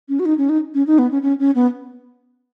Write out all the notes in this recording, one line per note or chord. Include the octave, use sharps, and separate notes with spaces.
C#4
F#4
D#4
C#4
D#4
C#4
D#4
B3
C#4
C#4
C#4
B3